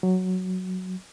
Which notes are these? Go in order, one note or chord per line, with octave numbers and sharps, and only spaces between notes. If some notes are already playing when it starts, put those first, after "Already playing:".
F#3